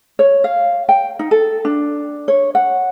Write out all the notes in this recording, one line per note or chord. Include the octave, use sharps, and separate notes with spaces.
C#5
F5
G5
D#4
A4
D4
C#5
F#5